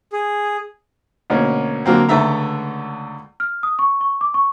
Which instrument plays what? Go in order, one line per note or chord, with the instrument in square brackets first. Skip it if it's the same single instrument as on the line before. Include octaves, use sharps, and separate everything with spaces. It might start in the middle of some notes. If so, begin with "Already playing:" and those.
[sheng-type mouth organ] G#4
[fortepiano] D2 B2 A#3 C#4
D3 F#3 A#3 C4
C#2 D3 A3 E5 A#5
[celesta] F6
D#6
C#6
C#6
D6
C#6